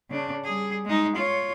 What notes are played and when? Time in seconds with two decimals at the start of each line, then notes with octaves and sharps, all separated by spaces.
0.10 C#3 D4
0.44 G3 G#4
0.85 G#3 D#4
1.16 F4 C#5